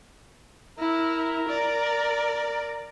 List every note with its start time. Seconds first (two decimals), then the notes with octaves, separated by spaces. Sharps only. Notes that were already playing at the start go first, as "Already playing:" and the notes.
0.79 E4 A#4
1.49 D5